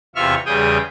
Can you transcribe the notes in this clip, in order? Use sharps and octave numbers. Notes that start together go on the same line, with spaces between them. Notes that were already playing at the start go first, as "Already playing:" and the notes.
E2 C3 F4 E5 C#6 F6
E2 C#3 G3 G#4 G5 D#6